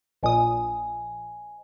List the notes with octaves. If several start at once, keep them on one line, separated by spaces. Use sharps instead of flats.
A#1 A#2 C5 D#5 G#5 D#6